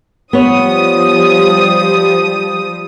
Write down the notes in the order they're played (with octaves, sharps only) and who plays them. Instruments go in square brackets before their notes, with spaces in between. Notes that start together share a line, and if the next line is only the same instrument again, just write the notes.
[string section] F3 G3 D#6 [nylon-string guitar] B3 C#5